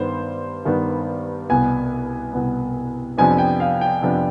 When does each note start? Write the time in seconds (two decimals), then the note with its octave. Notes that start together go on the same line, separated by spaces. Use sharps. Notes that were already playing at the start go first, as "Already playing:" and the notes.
Already playing: G2 D#3 B3 C5
0.65 G2 D#3 B3
1.50 C2 B2 B3 G#5
2.33 C2 B2 B3
3.17 F2 C3 F3 B3 D4 G#5
3.38 G5
3.60 F5
3.81 G5
4.02 F2 C3 F3 B3 D4